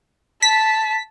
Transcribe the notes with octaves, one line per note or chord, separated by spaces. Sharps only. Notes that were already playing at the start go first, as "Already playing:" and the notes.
A5 B6